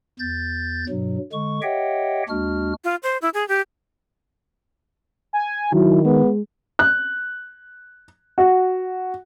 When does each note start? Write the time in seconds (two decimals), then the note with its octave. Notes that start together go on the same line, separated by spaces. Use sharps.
0.19 E2 G6 A6
0.89 G2 B2 F#3
1.33 D3 G#3 C#6
1.63 G4 C#5 D#5 E5 F#5 G5
2.29 D#2 G#3 D4 F#4 F6
2.84 F4
3.03 C5
3.22 E4
3.34 G#4
3.48 G4
5.33 G#5
5.73 D#3 F#3 E4
6.05 G#3 B3
6.79 F#6
8.38 F#4